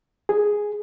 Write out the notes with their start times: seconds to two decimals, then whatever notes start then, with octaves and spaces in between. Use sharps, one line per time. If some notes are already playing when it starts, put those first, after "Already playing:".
0.29 G#4